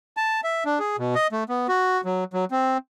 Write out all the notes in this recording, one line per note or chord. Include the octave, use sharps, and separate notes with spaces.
A5
E5
D4
G#4
B2
D#5
A3
B3
F#4
F#3
F#3
C4